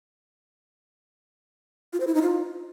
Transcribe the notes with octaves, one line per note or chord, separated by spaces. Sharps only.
F4
C5
E4
D#4
F4